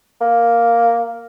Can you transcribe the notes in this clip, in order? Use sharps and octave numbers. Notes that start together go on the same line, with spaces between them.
A#3